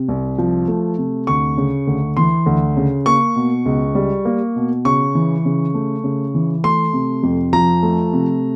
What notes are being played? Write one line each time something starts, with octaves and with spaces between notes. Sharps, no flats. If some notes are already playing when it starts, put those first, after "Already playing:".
Already playing: C3
C2
F3
A3
C3
D2 C#6
C#3
D2
E3 C6
D2
C#3
A#3 C#6
B2
C#2
G3
A#3
B2
C#3 C#6
E3
C#3
A3
C#3
E3
A3 C6
C3
F2
F3 A#5
A3
C3